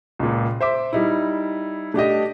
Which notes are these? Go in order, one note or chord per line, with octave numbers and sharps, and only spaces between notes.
C#2 A#2
C5 E5 D6
G3 D#4 E4
A3 D4 G4 D#5